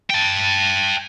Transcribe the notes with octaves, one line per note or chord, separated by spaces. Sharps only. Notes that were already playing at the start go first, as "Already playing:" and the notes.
G5 A5